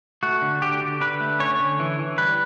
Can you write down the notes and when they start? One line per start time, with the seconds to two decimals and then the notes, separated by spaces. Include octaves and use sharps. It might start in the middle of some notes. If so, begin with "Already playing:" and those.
0.23 A3 F#4
0.42 D3
0.62 D3 G4
0.82 D3
1.01 D3 B4
1.20 A3
1.39 C#4 C#5
1.60 D3
1.80 E3
1.99 E3
2.18 G3 B4